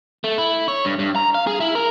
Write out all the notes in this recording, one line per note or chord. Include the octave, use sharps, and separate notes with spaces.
A3
E4
C#5
G2
G2
A#5
F5
G#4
E4
A#4